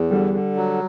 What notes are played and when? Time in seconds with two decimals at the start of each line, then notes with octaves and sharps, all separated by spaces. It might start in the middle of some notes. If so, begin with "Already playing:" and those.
Already playing: E2
0.10 D3 G3
0.33 D3
0.56 F#3